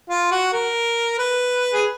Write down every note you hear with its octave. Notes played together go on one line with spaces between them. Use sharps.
F4
F#4
A#4
B4
G#4